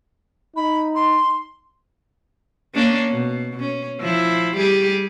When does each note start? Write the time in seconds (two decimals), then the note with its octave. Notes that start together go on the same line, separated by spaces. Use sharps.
0.56 D#4 B5
0.95 C6
2.74 A#3 C#4 D4
3.10 B2
3.59 C#4
4.01 F3 E4
4.57 G3 G4 G#4